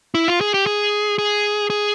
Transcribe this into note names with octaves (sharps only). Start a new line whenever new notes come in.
E4
F4
G#4
G4
G#4
G#4
G#4